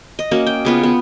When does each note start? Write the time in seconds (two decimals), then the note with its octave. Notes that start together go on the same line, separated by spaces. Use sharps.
0.19 D#5
0.31 A#3 C#4 F#4
0.47 G5
0.65 C#3 B3 F4
0.83 B3